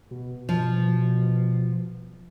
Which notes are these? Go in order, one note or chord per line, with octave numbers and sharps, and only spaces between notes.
B2
F3